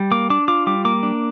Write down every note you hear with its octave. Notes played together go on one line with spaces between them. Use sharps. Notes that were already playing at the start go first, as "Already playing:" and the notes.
Already playing: G3
A#3 D6
D4 D6
F4 D6
G3 D6
A#3 D6
D4